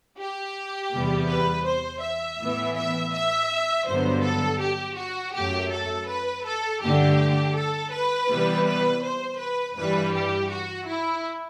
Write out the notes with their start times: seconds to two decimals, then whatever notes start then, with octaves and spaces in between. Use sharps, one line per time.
0.18 G4
0.92 E2 C3 G3 B3
1.29 B4
1.66 C5
2.02 E5
2.39 A2 E3 B3
2.77 E5
3.13 E5
3.87 G2 D3 F#3 B3 C5
4.23 A4
4.61 G4
4.97 F#4
5.34 F#2 F#3 A3 G4
5.72 A4
6.09 B4
6.45 A4
6.83 G2 D3 A3 G4
7.57 A4
7.93 B4
8.30 C3 E3 G3 B3
8.68 B4
9.04 C5
9.41 B4
9.77 G2 E3 G3 B4
10.15 G4
10.51 F#4
10.88 E4